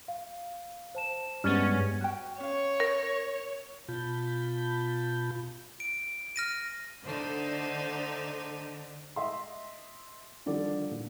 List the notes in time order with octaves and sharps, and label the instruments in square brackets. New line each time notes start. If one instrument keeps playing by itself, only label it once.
[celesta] F5
C5 A5 E7
[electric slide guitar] G2 [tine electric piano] G3 G#3 B3 [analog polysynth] C#4 [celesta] F6 A6
[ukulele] F#4 G5
[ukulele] C#4 F5 [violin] C#5
[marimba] A#4
[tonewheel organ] B2 F4 A5 B5 G6
[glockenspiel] D7
F6 A#6 D#7
[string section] D3 [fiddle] A3 D#4 [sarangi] C5
[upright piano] D#5 E5 C6
D3 D#3 F3 G3 A4 D5
A#2